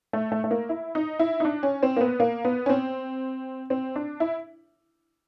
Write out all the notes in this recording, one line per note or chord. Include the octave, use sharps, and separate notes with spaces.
A3
A3
A3
A#3
E4
D#4
E4
D#4
D4
C#4
C4
A#3
B3
A#3
B3
C#4
C4
C4
D4
E4